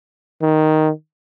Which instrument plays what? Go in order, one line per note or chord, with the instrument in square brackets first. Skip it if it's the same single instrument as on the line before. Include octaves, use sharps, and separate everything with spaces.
[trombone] D#3